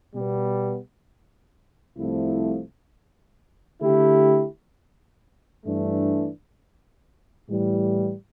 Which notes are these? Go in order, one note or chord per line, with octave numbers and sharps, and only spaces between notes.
B2 G3 B3
C2 C3 F3 A3 E4
D3 A3 E4 G4
G2 E3 A3 D4
A2 E3 G3